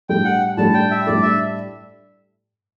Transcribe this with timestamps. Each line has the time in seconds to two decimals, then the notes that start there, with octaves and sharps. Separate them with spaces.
0.09 A2 G3 D4 A4 G5
0.25 F#5
0.57 A2 G3 D4 A4 A5
0.74 G5
0.91 E5
1.07 A2 G3 D4 A4 D5
1.23 E5